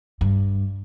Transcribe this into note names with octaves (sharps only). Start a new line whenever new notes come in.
G2